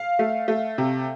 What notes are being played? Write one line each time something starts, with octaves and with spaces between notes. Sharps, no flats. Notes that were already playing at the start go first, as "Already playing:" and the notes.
Already playing: F5
A3
A3
C3